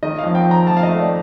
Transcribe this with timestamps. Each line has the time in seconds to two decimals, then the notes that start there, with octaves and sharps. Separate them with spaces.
0.03 D#3 D#5
0.18 F5
0.24 F2
0.35 G5
0.45 F2
0.51 A#5
0.67 F2 A5
0.77 F5
0.83 D#5
0.89 A3
1.00 D5